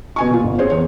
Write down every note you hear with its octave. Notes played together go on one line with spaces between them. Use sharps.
B2 G#5 C#6
A#2 F4
G1
C4 G#4 C5 C#5
E2 C#5